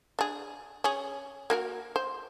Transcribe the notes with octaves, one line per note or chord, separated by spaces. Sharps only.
D4 G#4
C#4 G#4
A#3 F#4 A#4
C5